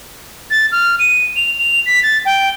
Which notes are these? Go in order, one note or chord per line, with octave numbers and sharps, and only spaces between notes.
A6
F6
D#7
F7
F7
B6
A6
G5